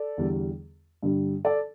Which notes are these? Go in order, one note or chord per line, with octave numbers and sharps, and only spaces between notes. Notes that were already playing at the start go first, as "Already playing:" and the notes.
Already playing: A4 D5
E2 D3 G3
G2 D3 G3
A4 D5